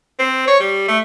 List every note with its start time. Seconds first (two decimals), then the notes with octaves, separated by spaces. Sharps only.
0.19 C4
0.47 C#5
0.60 G3
0.88 A3